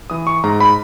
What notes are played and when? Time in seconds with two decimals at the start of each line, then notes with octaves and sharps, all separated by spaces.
0.10 E3 D#6
0.27 C#6
0.43 G#2 A#5
0.60 B5